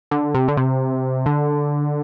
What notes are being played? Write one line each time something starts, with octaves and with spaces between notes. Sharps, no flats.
D3
C3
D3
C3
D3